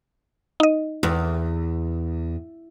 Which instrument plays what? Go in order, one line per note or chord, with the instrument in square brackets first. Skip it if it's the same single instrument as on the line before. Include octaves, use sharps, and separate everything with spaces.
[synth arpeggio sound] D#4 D#5
[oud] E2